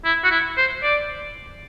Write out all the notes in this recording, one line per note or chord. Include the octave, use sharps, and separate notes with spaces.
E4
F#4
E4
C5
D5